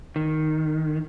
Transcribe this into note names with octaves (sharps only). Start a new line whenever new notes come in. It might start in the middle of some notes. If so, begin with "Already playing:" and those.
D#3